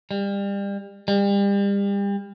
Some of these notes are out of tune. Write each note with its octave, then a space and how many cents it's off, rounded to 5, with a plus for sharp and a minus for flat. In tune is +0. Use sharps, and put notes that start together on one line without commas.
G3 +30
G3 +35